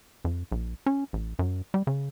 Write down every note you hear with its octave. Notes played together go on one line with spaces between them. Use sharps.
F2
A#1
C#4
A1
F#2
G3
C#3